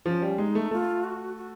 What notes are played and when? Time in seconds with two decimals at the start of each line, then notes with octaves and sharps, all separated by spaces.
0.06 F3 C#4
0.22 G3
0.38 G#3 D#4
0.55 A3
0.71 A3 F4
1.04 F#4
1.37 F#4